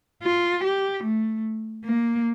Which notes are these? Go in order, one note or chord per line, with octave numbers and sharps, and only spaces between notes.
F4
G4
A3
A#3